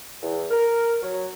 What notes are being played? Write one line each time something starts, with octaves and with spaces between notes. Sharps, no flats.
E2
A#4
F#3